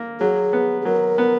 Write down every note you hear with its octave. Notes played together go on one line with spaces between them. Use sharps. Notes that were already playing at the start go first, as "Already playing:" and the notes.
Already playing: A#3
F#3 G#4
B3
G#4
F#3 A#4
B3